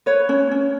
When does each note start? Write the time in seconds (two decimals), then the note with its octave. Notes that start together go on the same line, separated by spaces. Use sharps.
0.06 B4 C#5
0.29 C#4
0.51 C#4